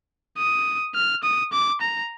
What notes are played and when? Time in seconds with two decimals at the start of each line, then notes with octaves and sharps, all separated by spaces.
0.38 D#6
0.95 F6
1.23 D#6
1.52 D6
1.81 A#5